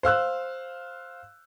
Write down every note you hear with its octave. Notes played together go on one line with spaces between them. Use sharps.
C5 F5 E6 F#6